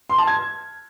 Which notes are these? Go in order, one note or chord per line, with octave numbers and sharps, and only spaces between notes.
C6
A5
G#6